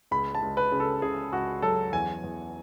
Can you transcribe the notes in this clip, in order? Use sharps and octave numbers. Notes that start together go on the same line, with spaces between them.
C#2 B5
A5
C#2
B4
C#3
A4
C#3 G#4
C#2 F#4
F#3 A4
E2 G#5
E2